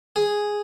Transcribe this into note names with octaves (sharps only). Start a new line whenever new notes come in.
G#4